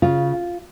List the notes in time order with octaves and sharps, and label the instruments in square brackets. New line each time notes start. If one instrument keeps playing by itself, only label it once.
[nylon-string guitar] C#3 F4